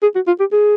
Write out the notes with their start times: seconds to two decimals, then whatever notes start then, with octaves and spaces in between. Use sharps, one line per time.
0.03 G#4
0.15 F#4
0.27 F4
0.40 G4
0.52 G#4